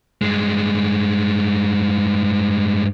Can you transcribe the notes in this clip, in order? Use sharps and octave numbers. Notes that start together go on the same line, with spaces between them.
G2 G#3